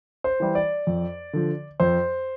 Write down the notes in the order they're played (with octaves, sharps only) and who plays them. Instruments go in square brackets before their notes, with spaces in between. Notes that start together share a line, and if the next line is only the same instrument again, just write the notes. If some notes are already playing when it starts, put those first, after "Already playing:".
[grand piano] C5
E3 G3
D5
F2
D3 F3
F2 C5